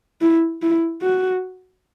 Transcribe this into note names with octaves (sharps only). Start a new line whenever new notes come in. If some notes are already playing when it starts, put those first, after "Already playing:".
E4
E4
F#4